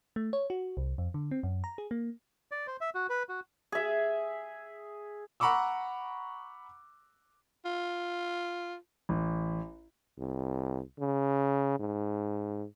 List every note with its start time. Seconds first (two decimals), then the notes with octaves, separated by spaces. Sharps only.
0.16 A3
0.33 C#5
0.50 F#4
0.77 C2
0.98 F2
1.14 D3
1.31 C4
1.43 F#2
1.64 A#5
1.78 G#4
1.91 A#3
2.52 D5
2.67 C5
2.81 E5
2.95 F#4
3.09 B4
3.29 F#4
3.72 G#4 E5
5.40 F#5 A#5 B5 C#6 D6 E6
7.65 F4
9.09 A1
10.18 C2
10.99 C#3
11.79 G#2